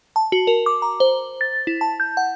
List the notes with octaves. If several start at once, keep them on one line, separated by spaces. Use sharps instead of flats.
A5
F#4
A#4
D6
A#5
C5
A6
E4
A5
G6
F#5